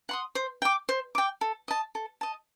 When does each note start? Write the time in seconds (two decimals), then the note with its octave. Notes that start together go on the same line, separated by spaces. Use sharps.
0.09 F#5 C6 D#6
0.35 C5
0.62 G5 D6
0.89 C5
1.15 G5 D6
1.41 A4
1.68 D#5 A5
1.95 A4
2.21 D#5 A5